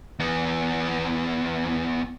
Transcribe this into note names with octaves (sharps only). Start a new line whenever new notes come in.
E2 B3